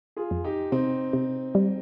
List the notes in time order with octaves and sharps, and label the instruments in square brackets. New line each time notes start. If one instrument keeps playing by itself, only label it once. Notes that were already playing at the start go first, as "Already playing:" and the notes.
[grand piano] F4 G#4
[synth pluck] F2
[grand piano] D#4 G4
[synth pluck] C3 [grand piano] C4 D#4
[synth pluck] C3
G3